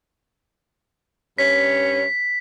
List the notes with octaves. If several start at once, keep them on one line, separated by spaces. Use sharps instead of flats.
G2 C#4 C#5 B6